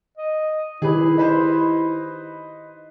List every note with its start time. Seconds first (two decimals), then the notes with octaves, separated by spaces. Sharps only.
0.18 D#5
0.82 D#3 E4 G4 G#4 B4
1.18 D#4 B4 C5